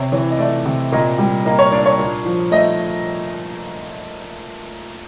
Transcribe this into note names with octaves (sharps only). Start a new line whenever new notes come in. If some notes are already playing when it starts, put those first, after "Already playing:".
Already playing: C3 C#5
E3 C#5
D#5
A3 D5
C3
A#2 D#5
G3
A#3 D#5
C#5
D4 D5
C#5
A#2
F3
A3 D#5